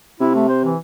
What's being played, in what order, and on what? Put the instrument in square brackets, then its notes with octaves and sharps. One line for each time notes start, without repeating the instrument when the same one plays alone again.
[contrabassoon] C3 [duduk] E4
[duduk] A3
C5
E3